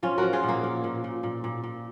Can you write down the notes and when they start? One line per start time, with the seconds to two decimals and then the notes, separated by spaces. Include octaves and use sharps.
0.03 F3 C#4 F4
0.18 F3 F#4 A#4
0.33 F4 G#4
0.43 A#2
0.48 A#3
0.64 A#2
0.84 A#2
1.04 A#2
1.23 A#2
1.44 A#2
1.64 A#2